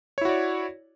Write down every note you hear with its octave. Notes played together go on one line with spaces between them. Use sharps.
E4 F#4 C#5 D5